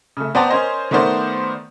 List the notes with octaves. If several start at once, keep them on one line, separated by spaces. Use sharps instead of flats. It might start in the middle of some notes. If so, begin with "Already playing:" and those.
C#3 A3
B3 C5 D5 G5 A5 A#5
C#4 A#4 C5 D#5
D#3 A3 B3 A#4 C5 D5